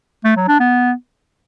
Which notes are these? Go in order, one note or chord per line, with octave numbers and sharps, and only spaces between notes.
A3
F#3
D4
B3